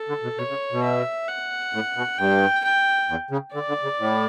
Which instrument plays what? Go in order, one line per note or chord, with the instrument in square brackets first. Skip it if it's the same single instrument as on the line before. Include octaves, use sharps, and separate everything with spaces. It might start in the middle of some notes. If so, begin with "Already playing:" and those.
Already playing: [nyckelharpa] A4
[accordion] D3
B2
[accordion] B2 [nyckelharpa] C#5
[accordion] C#3
B2
[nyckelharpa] E5
F#5
[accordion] A2
B2
[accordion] G2 [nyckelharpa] G5
[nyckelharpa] G5
[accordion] E2
C#3
[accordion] D3 [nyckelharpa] D5
[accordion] D3
C#3
A2